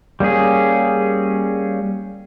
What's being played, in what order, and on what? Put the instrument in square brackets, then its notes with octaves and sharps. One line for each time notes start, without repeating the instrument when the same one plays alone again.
[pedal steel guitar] G3 A#3 C#4 G#4